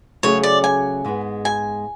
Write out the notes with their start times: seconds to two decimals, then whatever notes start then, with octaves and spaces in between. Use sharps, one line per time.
0.23 C#3 F#3 A3 C#4 G#4 C#5
0.43 D5
0.64 G#5
1.05 G#2 G#3 B3
1.45 G#5